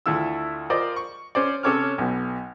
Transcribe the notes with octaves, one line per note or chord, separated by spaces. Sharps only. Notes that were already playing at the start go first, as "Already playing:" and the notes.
D2 A3 E4 F4 E6
F4 A#4 C5 D5 D#5
C#6
C#4 C5 D5
C3 C#4 A4 C#5 D6 F6
B1 B2